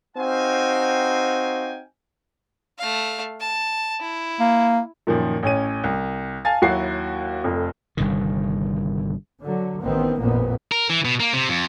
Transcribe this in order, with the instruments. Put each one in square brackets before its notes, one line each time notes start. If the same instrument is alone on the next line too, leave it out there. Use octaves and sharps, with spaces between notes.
[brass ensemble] C4 D#4 F#4 F5 G5 G#5
[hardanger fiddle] A3 F5
A5
E4
[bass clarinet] A#3
[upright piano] F#2 A#2 D#3 F3
A1 C#4 D#7
C2
F5 G#5 A5 A6
D#2 F#3 E4 F#4 C7
F1 F2
[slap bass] G1 G2 C3 D#3
[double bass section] D3 F#3
A1 D#3 B3 C4
A1 F2 A#2 A#3 B3
[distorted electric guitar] A#4
E3
B2
A#3
C3
F2